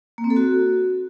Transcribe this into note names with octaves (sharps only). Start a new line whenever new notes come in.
A#3
C4
A4
F#4